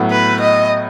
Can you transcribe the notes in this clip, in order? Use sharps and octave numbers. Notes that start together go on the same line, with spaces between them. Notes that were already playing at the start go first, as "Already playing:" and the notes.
Already playing: A2 F#3 B3
B4
D#5